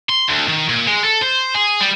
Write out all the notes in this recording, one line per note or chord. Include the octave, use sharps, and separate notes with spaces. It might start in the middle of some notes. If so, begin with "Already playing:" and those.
C6
D2
D#3
A#2
G#3
A4
C5
G#4
G3